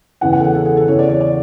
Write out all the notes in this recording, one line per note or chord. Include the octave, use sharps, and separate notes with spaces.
E2 C#3 E3 F#5
F#5
A4
G#4
A4
G#4
A4
E2 C#3 E3 C#5
D5
C#5
D5